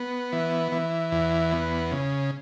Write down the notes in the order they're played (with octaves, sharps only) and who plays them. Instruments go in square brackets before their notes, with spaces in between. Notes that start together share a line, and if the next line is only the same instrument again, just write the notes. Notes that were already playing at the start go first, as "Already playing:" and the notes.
Already playing: [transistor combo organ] B3
E3
E3
E2
B3
C#3